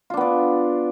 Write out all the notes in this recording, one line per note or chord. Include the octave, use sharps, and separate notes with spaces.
B3 D4 F4 D5